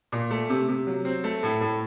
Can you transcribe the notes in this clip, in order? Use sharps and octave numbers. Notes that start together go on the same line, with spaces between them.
A#2
A3
C3
C3
F#3
C4
A3
A2
A2